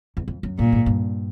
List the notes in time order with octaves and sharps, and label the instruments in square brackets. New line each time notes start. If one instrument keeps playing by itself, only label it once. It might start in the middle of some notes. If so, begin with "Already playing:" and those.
[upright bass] E2
F2
F#2
[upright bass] G2 [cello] A#2
[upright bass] G#2
G2